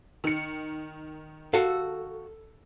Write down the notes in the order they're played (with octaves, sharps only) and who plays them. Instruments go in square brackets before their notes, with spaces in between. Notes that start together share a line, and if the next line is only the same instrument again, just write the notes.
[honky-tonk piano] D#3 C#7
[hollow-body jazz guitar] F#4 F5 [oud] A4